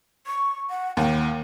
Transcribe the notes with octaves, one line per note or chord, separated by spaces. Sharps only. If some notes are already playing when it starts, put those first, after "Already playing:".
C#6
F#5
D#2 A#3 F#5 G5